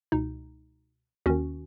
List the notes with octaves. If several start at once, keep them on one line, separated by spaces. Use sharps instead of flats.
C#2 B2 D#4
D#2 D#3 C#4 F#4